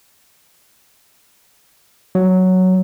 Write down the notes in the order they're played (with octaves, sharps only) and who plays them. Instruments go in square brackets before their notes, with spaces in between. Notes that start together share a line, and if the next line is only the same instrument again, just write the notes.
[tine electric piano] F#3